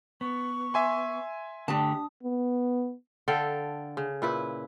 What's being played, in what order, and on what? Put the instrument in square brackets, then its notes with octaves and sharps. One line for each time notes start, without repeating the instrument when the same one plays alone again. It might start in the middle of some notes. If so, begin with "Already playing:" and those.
[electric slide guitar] B3 [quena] C#6
[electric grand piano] E5 G#5 C6
[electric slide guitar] D3 A3 G4 [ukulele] D4 A5 [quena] D#6
[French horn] B3
[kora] D3 A4 F5 G5
C#3
A#2 E4 B4